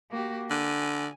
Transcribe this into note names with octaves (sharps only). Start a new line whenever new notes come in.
A#3 F#4 G4
D3 G#5